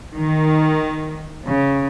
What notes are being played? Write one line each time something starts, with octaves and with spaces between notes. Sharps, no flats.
D#3
C#3